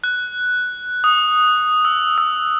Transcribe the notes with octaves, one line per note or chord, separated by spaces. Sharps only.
F#6
D#6
E6
E6